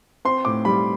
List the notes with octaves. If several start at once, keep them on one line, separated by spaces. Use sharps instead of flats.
C4 C6
A2 D6
G3 B5